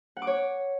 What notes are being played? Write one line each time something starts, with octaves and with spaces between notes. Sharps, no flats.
F#5
D6
C#5